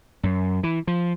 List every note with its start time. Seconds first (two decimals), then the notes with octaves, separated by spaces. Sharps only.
0.23 F#2
0.63 E3
0.87 F3